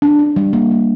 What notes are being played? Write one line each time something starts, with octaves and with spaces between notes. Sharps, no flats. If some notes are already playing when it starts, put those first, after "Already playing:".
D4
D4
G3
A#3
A#3